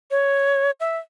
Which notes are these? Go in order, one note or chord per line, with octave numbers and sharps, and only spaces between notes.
C#5
E5